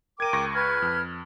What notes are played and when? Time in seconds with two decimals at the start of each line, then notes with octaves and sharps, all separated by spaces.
0.20 A#4 G5 D6 G#6 D#7
0.33 C#2 C#6 A#6
0.54 B4 F6 G#6
0.82 F2